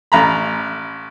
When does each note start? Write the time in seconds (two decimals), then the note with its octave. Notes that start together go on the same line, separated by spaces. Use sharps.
0.12 A1 A#5 B5